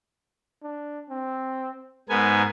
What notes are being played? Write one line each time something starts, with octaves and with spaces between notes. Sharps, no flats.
D4
C4
G#2 B3 A#4 G#5